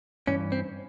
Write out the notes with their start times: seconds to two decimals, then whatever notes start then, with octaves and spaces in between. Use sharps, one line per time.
0.27 G2 E3 C#4
0.52 C4